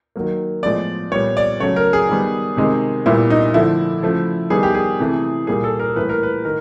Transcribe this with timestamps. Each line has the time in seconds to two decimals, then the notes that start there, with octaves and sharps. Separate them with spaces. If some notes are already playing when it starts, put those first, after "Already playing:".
0.16 D#3 F#3 A#3
0.63 A2 F3 G#3 B3 D5
1.11 A#2 G3 B3 C#5
1.37 D5
1.60 C#3 F#3 A3 C#5
1.76 A#4
1.93 G#4
2.09 D#3 G3 B3
2.57 C3 D#3 G#3
3.06 A#2 G3 B3 E4
3.30 D#4
3.54 D3 F3 A3 E4
4.03 C#3 F3 A3
4.50 D#3 G3 B3 G#4
4.63 G4
4.75 G#4
5.00 C3 E3 A3
5.47 A#2 G3 A#3 G#4
5.64 A4
5.79 A#4
5.96 A2 E3 G3 A#3 B4
6.09 A#4
6.23 B4
6.45 D#3 A#4